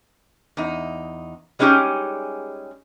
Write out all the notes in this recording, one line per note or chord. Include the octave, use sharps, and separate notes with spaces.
E2 D#4
G3 G#3 C#4 D#4 G4 G#4